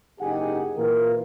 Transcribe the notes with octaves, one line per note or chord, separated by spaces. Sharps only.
F#1 D#4 G4 G#4 F#5 G#5
A#2 E3 F4 A#4